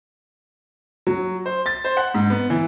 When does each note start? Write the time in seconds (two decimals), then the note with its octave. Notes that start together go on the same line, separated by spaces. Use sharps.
1.07 F#3
1.46 C5
1.66 A6
1.84 C5
1.97 F#5
2.14 G#2
2.30 B3
2.50 E3